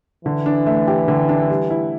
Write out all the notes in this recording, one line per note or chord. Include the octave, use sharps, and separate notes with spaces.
D3 E3
D4
A3
G4
D3
D4
G3
E4